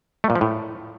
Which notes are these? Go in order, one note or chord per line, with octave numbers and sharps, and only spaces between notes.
A3
A#2
F3
A2